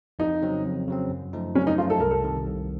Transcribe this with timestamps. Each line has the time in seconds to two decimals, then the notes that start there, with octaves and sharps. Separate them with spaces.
0.19 F2 D#4
0.42 C#3 F#3 C4
0.65 F2
0.88 C#3 F#3 C4
1.10 F#2
1.33 F3 A3 D#4
1.55 F#2 C#4
1.67 D#4
1.78 F3 A3 D#4 F4
1.90 A4
2.00 C2 A#4
2.11 A4
2.24 C3 D#3
2.46 C2